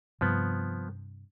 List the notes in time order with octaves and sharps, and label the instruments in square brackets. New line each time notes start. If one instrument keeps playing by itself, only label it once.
[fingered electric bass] G2 C3 [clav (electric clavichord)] F3 B3